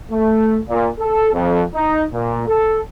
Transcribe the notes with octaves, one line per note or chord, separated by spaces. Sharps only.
A3
A#2
A4
F2
D#4
A#2
A4